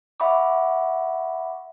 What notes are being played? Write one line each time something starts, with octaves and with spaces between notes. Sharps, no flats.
E5 F#5 B5 C#6 D6